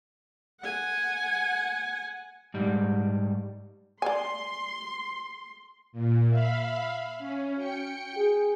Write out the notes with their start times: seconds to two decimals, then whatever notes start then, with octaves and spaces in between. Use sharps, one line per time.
0.61 F#5 G#5
2.54 G#2 G3
4.02 D5 G#5 C6
5.92 A#2
6.29 E5 F5 B5
7.18 C#4
7.57 F#4 G5 C#7
8.16 G#4